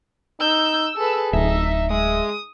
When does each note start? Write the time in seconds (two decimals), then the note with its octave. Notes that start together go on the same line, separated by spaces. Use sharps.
0.40 D#4 E6 G6
0.97 G#4 A4 B4
1.33 D1 D#4 E5
1.90 G#3 E5 D#6